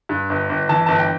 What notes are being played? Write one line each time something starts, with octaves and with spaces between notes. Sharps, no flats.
G2
G1
G1
E3 A5
G1 A5
G5